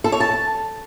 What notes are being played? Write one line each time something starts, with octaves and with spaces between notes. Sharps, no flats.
A4
C#5
A5